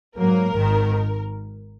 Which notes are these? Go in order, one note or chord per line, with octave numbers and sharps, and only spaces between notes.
G#2 F#3 A#3 A#4
G#1 G#2 D#3